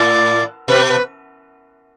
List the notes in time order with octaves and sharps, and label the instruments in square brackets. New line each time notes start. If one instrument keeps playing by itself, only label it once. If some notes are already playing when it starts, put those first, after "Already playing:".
Already playing: [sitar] A2 [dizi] D5
[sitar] B2 [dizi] B4
[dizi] B4